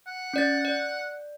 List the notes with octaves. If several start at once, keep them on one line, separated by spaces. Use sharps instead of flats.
F#5
C#4 D5 A6
D5